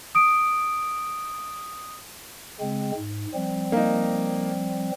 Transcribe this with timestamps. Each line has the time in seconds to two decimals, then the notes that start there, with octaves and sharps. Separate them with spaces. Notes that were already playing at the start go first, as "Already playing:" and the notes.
0.15 D#6 D7
2.61 C#3 G#3 C4
2.97 G#2
3.34 F3 G3 C4
3.72 A#3 D#4